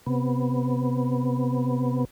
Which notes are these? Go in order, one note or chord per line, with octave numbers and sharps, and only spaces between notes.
C3 B3